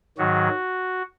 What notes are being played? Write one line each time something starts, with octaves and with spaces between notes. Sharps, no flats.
G#2 D#3 F#3 F#4